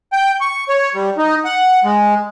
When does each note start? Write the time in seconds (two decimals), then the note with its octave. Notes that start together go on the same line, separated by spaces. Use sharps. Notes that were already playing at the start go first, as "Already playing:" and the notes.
0.13 G5
0.41 C#6
0.69 C#5
0.95 G3
1.18 D#4
1.45 F#5
1.84 G#3